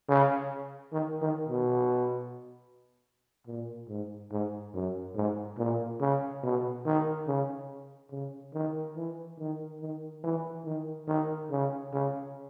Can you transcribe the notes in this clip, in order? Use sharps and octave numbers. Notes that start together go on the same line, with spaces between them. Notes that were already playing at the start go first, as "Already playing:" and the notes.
C#3
D#3
D#3
B2
A#2
G#2
G#2
F#2
G#2
A#2
C#3
B2
D#3
C#3
C#3
D#3
E3
D#3
D#3
E3
D#3
D#3
C#3
C#3